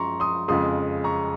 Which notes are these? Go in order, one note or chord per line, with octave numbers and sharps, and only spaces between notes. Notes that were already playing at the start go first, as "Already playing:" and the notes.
Already playing: F#2 F3 G#3 A#5 C6 C#6
C6 D#6
F2 C#3 F3 G#3 C6 D#6
A#5 C#6